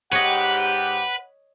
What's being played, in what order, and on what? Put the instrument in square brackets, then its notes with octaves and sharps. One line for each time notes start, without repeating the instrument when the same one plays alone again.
[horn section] G#2 G4 [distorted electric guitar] B4 [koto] C#5 D#5 [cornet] F#5